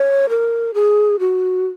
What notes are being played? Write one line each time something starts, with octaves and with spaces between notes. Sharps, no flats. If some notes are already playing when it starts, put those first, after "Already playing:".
Already playing: C#5
A#4
G#4
F#4